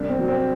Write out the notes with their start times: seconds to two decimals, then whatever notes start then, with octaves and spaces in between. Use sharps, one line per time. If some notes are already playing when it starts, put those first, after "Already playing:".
Already playing: C2 D4
0.09 C4
0.19 F#3
0.28 C4